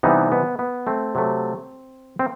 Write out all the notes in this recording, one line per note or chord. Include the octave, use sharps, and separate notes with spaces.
C3 E3 G3 B3 D#4
B3
B3
A3 C4
C3 F#3 A3
C4